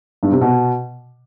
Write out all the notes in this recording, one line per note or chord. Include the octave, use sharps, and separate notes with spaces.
G2
C3
B2